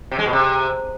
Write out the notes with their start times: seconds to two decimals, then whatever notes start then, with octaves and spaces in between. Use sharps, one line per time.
0.11 C3
0.19 G#3
0.26 B2
0.33 C3